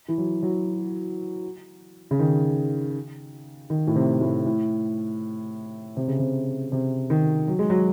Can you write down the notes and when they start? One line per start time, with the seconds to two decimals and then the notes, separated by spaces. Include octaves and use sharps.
0.08 E3
0.18 F#3
0.43 F#3
2.11 C#3
2.19 D#3
3.70 D#3
3.87 A2
3.96 C3
4.21 A2
4.46 A2
5.97 C3
6.08 C#3
6.19 C3
6.72 C3
7.10 D#3
7.48 F#3
7.59 G#3
7.70 F#3